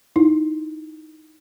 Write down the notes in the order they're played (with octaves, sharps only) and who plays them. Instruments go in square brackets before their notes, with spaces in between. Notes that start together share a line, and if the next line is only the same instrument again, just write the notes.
[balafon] D#4 E4